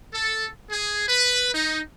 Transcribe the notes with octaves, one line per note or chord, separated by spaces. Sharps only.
A4
G#4
B4
D#4